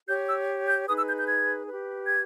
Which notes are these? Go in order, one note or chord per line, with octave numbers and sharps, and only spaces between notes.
G4 C#5 G6
E6
G6
D#4 G#4 B4 D#6
E6
G6
G6
G#6
G4 B4
G#6